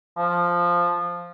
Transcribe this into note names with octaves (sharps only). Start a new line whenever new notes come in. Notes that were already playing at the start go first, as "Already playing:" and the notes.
F3